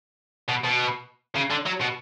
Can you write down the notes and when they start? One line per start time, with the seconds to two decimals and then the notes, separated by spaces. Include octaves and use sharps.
0.48 B2
0.64 B2
1.36 C#3
1.51 D3
1.66 F#3
1.81 B2